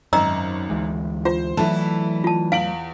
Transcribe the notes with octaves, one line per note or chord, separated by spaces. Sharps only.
G#1 F#2 D#5 A#5 E6
D2 E3 G#3
F4 C5
E3 F#3 A3 E4 A4
F4 A5
E2 F5 D7 F#7